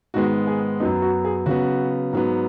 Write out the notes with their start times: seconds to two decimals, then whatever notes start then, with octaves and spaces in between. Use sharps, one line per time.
0.14 G#2 D#3 G#3 B3 F#4
0.47 G#4
0.80 F#2 F#3 B3 D#4
1.02 F#4
1.25 G#4
1.46 C#3 F#3 B3 F#4
2.13 G#2 F#3 B3